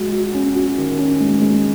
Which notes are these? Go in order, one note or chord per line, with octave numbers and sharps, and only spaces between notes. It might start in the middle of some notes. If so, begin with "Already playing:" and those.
Already playing: G#3 F#4
F#4
C#4
F#4
D#3
C#4
G#3
G#3